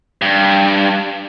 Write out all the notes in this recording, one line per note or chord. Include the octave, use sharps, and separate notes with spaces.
G2